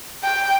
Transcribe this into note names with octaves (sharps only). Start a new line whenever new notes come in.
G5